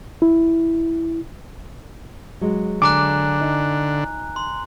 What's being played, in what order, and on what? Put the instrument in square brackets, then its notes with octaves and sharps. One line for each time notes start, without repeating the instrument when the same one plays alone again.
[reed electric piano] E4
[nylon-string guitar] F#3 G#3
[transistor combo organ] D3 [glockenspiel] G#5 A#5 F#6 [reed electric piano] D6
[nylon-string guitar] D#4
[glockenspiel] C6